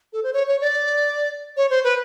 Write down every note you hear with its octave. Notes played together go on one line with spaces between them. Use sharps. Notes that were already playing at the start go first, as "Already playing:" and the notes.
A4
C5
C#5
C#5
D5
C#5
C5
B4